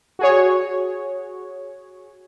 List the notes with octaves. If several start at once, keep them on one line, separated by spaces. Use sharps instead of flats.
F#4 G#4 C#5